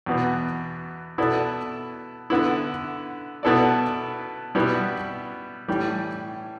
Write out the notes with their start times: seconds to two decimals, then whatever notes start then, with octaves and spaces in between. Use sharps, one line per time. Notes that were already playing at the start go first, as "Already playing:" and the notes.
0.06 E2 B2 B3
1.18 B2 B3 E4 A4 D5
2.30 D3 B3 E4
3.43 B2 B3 E4 A4 D5
4.55 B2 G3 B3 E4
5.68 A2 E3 G3